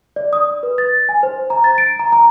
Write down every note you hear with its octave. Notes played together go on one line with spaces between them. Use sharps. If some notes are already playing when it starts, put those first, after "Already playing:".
D5
D#6
B4
A6
G#5
C5
A#5
A6
D7
A#5
A#5